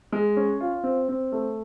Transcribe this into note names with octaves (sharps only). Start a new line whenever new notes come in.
G#3
C#4
F4
C4
C4
A3